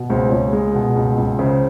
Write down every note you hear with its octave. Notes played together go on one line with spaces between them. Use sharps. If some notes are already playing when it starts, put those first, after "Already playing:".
Already playing: B2
C#2 C5
C#2 C#5
G#3
B2
C#2
C#2
C#3 C5